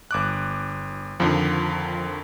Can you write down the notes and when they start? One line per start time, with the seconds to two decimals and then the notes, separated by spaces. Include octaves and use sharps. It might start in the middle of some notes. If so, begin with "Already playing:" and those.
0.11 G1 D6 F#6
1.20 F2 D3 D#3 F3